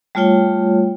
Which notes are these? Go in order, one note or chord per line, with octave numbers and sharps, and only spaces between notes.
G3 A3 F4 C#5 G5